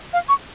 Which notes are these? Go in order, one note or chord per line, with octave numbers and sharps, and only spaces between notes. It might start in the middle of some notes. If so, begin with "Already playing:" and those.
F5
C#6